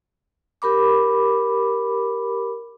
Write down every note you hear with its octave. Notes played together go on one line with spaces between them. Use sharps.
G4 A#4 B5 D6